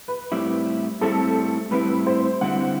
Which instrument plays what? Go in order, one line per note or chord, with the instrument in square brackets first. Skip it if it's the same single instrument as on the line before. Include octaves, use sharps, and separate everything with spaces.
[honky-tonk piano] B4
[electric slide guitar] A2 G3 C4 E4
[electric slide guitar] A2 G3 C4 E4 [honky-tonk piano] A4
[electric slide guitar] A2 G3 C4 E4 [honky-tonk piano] B4
[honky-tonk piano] C5
[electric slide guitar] G2 D3 G3 C4 E4 [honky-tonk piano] F#5